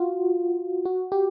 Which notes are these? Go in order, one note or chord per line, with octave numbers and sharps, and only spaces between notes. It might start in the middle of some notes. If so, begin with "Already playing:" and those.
Already playing: F4 F#4
F#4
G4